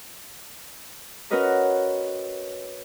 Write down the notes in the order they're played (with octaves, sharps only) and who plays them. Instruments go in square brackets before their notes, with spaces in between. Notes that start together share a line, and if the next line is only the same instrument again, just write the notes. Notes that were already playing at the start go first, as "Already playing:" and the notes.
[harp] C#4 F#4 A#4 B4 D#5 A#5